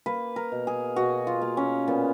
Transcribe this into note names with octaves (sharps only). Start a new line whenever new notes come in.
A#3 B4
A#4
B2
G#4
B2 F#4
F4
A#3
C#4
A#2 B3